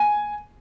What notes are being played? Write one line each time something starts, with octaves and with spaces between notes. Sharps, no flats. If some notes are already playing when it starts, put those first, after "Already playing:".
Already playing: G#5